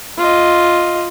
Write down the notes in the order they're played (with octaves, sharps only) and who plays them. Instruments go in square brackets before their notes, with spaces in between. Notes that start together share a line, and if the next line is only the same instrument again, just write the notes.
[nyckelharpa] F4 D#5